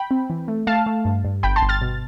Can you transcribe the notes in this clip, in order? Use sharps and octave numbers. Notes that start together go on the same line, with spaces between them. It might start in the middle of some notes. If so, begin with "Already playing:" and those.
Already playing: G5 B5
C4
E3
A3
A3 F5 A5
A3
G2
G2
G1 G5 B5
A5 C6
G1
F6 A6
B2